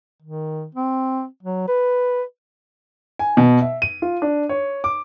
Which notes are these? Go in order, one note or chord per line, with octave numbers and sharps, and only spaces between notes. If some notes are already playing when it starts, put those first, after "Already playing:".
D#3
C4
F#3
B4
G#5
B2
E5
D#7
F4
D4
C#5
D6